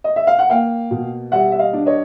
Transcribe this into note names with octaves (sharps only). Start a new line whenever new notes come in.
D#5
E5
F5
F#5
A#3 F5 G5
B2
G3 E5 F#5
E5
D#5 F5
D4
C#5 D#5